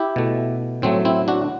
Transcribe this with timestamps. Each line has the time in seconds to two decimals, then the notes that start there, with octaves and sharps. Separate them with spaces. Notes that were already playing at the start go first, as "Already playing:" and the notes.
Already playing: E4 G4
0.16 B2 A3
0.82 A2 F#3 A3 C4
1.05 C4 E4
1.28 D4 F#4